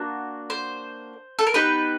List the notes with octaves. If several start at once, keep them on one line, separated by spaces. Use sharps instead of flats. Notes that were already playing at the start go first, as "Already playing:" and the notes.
Already playing: A#3 D4 F#4
C5
A4
A#4
B3 D#4 G4 B4